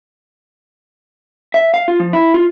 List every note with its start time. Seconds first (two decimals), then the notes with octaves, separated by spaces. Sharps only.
1.54 E5
1.74 F5
1.88 F4
2.00 F3
2.13 E4
2.34 F4